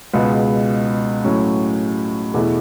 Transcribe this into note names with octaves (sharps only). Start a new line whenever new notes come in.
C#2 B2 G#3 B3
A2 F#3 C#4
E2 B2 A3 E4